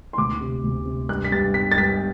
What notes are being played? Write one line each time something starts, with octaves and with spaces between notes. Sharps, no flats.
C6
D2 D6
C3
D2
C3
G2 F#6
B6
G2 A6
G2 B6
A6
G2 B6